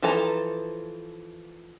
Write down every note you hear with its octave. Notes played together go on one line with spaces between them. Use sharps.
E3 F3 A4 A#5